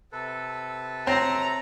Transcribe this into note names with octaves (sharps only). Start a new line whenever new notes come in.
C3 A4 B4
C4 C#5 A#5